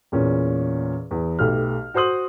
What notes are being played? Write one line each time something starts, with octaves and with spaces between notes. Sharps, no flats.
E2 A#2 C#4
E2
B1 A3 G4 F6
F#4 C5 C6 D#6 F#7